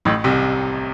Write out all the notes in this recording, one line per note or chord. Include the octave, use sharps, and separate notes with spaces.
A1 A2
C2 C3